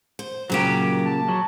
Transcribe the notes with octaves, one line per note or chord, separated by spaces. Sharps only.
C5
A#2 C#3 F#3 A#3 G4
A5
F#3